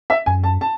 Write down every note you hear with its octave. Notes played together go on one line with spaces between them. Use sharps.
E5
F#2 G#5
A5
A5